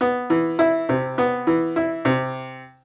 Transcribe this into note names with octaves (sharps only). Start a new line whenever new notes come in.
B3
E3
E4
C3
B3
E3
E4
C3